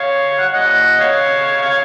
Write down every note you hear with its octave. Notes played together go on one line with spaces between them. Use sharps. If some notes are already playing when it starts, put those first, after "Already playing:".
Already playing: C#5 F5
F#5
D#5 F#5
C#5 F5
C#5 F5